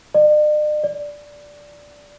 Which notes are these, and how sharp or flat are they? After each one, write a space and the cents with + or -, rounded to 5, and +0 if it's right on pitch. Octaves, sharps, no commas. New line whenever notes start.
D5 +45
D5 -5